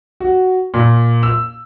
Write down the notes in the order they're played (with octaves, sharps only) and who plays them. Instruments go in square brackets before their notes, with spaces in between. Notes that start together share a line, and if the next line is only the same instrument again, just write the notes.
[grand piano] F#4
A#2
E6